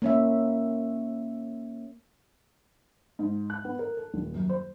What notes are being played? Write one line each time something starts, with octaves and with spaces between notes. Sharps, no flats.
A#3 C#4 E5
G#2
F#6
B3
A#4
A4
D#1
F#2
C5